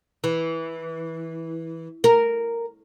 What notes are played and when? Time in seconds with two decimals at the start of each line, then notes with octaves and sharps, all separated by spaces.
0.24 E3
2.04 A#4